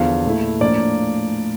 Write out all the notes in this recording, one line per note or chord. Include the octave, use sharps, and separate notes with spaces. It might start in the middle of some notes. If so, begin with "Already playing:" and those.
Already playing: E2 D3 F3 F5
A#2 A3 E4
A2 F3 A#3 D4 D5